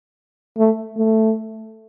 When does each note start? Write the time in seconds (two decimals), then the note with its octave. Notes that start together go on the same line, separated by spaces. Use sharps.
0.57 A3
0.97 A3